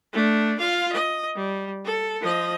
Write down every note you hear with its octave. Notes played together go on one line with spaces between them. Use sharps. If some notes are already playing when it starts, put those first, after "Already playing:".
A3 D4
F4 F5
D#5
G3
A4
F3 D#5